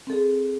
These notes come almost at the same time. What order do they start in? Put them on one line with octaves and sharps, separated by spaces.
C4 A4 G#4